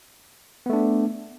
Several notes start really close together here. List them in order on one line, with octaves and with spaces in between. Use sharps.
B3 A3 D4